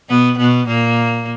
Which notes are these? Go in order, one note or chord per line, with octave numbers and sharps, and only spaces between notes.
B2 B3
B2 B3
A#2 A#3